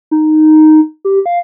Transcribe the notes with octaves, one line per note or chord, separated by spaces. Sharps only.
D#4
G4
F5